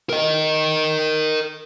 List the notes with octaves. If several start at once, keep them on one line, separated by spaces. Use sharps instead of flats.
A#4 D#5